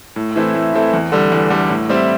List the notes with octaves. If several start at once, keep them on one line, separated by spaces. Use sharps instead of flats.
A2
E3 A3 C4 E4
A2
E3 A3 C4 E4
E2
D3 G3
E2
D3 G3
A2
G3 C4 E4